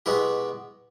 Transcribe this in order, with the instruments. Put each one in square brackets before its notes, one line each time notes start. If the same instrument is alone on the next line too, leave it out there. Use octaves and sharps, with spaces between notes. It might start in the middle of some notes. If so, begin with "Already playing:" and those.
[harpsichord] B2 G#3 B3 E4 G4